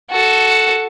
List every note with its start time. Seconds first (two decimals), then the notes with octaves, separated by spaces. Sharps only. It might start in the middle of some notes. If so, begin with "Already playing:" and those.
0.10 F#4 A4